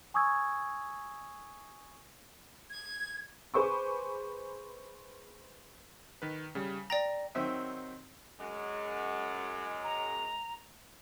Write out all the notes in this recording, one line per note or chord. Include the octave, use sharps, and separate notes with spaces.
G#5 C#6 D#6 E6 G#6
G#6
G#4 B4 C5 C#6 D6
D#3 B4
C#3 G3
D5 G5 A#5 A#6
D#3 F#3 C4 E5 D#6
F#2 G#3 F#4
A#5